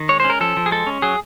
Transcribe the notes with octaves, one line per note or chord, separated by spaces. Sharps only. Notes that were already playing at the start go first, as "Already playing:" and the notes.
Already playing: D#3
G#3 C#5
C#4 C5
A#4
F3 A4
F3
G#4
G#3 A4
C#4
F#3 G#4